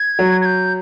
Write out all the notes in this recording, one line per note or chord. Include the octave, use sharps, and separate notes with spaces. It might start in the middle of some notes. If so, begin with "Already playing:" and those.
Already playing: G#6
F#3
G#6
G6